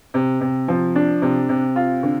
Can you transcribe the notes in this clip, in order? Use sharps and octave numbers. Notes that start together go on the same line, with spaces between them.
C3
C3
F3
D4
C3
C3
F4
D3